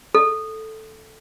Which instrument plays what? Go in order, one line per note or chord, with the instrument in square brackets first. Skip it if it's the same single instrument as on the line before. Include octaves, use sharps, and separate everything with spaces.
[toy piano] A4